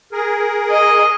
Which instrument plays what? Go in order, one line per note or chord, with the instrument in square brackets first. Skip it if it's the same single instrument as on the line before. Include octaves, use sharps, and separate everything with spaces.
[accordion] G#4 A#4
[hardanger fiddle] D#5